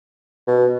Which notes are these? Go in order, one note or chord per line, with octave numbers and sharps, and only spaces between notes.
B2